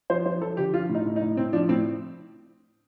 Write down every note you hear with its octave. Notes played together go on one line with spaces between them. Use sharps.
F3 C5
F3 C5
F3 A4
D3 G4
F3 F4
A2
D#4
A2
D#4
A2
A2 C4
F3 D4
A2 C4